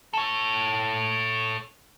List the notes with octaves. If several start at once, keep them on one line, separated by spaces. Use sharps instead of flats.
A4 C#5